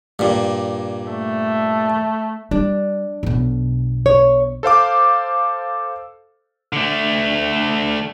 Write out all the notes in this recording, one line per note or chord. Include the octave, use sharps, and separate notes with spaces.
G2 A#2
A3
G3 D4
B1 B2
C#5
A4 C5 F5 D6
D3 A3